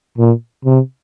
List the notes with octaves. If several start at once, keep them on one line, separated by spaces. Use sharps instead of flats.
A#2
C3